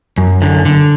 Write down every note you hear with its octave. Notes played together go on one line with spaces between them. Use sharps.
F#2
D3
D3